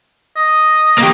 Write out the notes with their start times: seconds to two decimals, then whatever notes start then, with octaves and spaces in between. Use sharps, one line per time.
0.36 D#5
0.98 A#3 G4